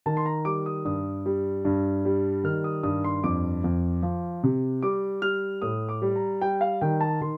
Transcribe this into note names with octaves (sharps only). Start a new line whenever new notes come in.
D#3 A5
C6
A#5
G3 D6
D#6
G2 D#6
G3
G2
G3
D#3 F6
D#6
G2 D#6
C6
F2 D6
F2
F3
C3
G3 D6
G3 F6
A2 D#6
D6
G3
A#5
G3 G5
F5
D#3 G5
A5
D#3 C6